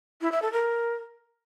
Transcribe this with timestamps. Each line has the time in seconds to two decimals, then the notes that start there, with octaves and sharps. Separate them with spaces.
0.21 E4
0.32 E5
0.42 A4
0.53 A#4